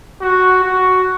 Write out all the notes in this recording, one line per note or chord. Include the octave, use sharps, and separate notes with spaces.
F#4
F#4